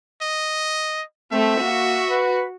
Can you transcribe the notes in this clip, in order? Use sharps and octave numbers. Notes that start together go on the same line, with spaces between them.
D#5
A3 C4 E5
A#3 F#4
B4